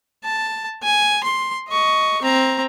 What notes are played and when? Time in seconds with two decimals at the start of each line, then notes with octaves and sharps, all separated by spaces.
0.24 A5
0.83 G#5
1.23 C6
1.69 D#5 C#6
2.22 C4 A#5